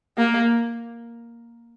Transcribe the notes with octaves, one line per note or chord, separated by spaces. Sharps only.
A#3